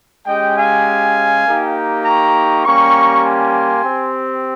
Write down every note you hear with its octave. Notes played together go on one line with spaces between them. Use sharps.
G#3 C#4 G4 D#5 G5
F5 G#5
A#3 D#4 G4
G5 A#5
A#5 C#6
G3 A#3 C#4 G4 A#5 C#6
G#5 C6
C4 G4